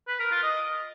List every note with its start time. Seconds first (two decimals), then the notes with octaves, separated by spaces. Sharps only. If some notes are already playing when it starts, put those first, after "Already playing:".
0.08 B4
0.20 A#4
0.31 F4
0.43 D#5